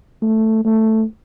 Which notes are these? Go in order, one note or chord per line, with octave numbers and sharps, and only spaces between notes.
A3
A3